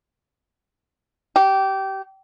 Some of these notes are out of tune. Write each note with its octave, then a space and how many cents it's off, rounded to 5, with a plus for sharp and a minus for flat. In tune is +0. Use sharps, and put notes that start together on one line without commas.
G4 -20